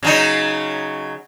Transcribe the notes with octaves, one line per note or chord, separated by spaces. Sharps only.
C#3 F#3 D#4